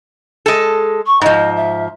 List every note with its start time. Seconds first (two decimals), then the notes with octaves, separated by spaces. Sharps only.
0.46 G#3 A4
1.06 C#6
1.21 G#2 F3 D#5
1.56 E5